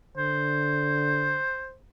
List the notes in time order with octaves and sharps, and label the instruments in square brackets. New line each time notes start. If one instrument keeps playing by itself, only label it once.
[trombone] D3 [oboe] C5